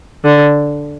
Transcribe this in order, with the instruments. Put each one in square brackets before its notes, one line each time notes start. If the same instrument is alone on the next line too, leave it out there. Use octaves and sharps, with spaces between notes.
[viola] D3